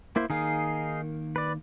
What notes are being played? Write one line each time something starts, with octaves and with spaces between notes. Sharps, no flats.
A#3 E4 C5
D#3 A#3 D#4 G#4 F5
B4 D5